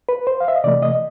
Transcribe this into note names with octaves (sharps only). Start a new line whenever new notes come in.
B4
C5
F5
E5
D#5
C3 E3 A3 D5
D#5